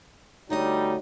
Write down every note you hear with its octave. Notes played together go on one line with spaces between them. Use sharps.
D3 G3 A3 D#4 F#4 C#5 D#5